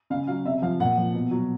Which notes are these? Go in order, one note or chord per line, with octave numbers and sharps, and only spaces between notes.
C#3 F5
F#3 F5
C3 E5
F3 F5
A#2 F#5
F3
B2
F#3